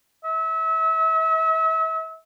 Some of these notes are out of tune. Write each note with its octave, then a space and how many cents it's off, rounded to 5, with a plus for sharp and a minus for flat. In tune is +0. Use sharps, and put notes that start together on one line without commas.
E5 -35